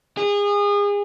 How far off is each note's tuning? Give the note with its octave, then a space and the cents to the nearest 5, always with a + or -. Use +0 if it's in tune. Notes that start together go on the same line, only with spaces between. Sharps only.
G#4 -30